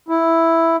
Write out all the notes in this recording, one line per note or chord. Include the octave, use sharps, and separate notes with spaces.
E4